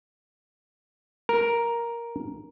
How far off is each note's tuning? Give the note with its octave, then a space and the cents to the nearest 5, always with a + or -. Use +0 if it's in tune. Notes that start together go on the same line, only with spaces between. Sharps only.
A#4 +5